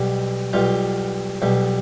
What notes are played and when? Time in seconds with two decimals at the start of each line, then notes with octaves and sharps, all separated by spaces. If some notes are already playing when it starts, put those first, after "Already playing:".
Already playing: B1 B2 G3
0.53 B1 B2 G3 F4
1.42 B1 B2 G3